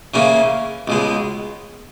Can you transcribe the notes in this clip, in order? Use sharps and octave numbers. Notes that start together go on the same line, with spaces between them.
C#3 E3 A#3 C#4
C#2 B2 G#3